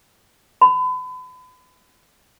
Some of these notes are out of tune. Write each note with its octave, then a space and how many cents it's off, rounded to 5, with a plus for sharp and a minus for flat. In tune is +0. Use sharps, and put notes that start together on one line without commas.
B5 +35